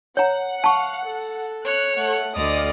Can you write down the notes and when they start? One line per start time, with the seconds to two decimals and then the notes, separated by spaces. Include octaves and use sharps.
0.17 C#5 F#5 A#5
0.64 F5 A5 C#6
1.05 A4
1.64 C#5 F#6
1.97 A3 F#5
2.35 D2 D5 D#5 D#6 F6